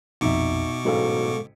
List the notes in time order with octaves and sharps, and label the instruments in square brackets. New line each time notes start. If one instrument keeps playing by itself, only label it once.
[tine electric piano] A#1 F2 [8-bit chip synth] B2 C#6 D6 [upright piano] D#4 E5
[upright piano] A1 G#2 F#3 [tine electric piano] G#3 A4 F5